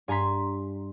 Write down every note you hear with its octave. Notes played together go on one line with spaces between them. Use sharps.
G2 G#5 A#5 C6 B6